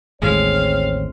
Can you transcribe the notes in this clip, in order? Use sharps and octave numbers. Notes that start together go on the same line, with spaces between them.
A1 D#2 A2 G#3 C4 C#5 F5